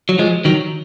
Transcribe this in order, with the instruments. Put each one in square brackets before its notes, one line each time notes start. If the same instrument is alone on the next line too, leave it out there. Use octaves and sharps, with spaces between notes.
[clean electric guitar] F#3
F3 G#3
D#3 F#3